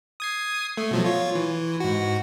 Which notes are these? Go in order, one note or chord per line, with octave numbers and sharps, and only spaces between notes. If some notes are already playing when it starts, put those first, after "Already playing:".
D#6 G#6 C7
A3
B2 F3 F#3
F4 C#5
E3
G#2 F#4